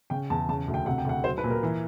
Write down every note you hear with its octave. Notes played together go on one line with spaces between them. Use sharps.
C#3 G5
E2 A5
C#3 A5
D2
G5
C3 F#5
G5
D2 F#5
F#3 C5
B4
A#2
A#4
E3